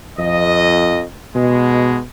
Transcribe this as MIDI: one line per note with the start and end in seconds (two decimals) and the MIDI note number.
0.18 1.03 41
0.18 1.03 75
1.35 2.00 47
1.35 2.00 56